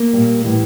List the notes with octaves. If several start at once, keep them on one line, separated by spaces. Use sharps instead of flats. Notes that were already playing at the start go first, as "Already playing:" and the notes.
Already playing: A#3
A#2 G3
A2 E3 G3